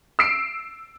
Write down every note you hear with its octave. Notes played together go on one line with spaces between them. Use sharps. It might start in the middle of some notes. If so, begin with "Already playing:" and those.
E6 C7 D7